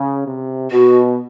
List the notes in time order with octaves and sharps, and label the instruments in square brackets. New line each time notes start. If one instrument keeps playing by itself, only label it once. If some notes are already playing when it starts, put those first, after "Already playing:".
Already playing: [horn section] C#3
C3
[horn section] B2 [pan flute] F#4